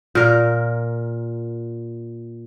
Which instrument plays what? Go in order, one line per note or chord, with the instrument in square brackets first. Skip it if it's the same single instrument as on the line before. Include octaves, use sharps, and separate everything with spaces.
[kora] A#2 A#4